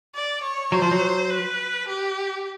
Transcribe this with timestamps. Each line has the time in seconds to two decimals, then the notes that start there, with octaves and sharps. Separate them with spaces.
0.15 D5
0.43 C#5
0.72 F#3 C5
0.82 F3
0.91 F#3
1.30 B4
1.88 G4